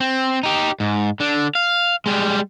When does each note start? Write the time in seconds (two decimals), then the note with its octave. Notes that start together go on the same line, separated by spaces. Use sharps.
0.01 C4
0.43 D#4 G4
0.80 G#2
1.20 D3 D4
1.55 F5
2.06 G3 G#3